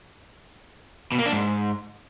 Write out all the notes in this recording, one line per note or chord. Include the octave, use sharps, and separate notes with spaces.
B2
A#3
D4
G#2